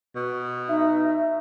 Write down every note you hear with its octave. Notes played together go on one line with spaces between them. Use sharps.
B2
D#4 E5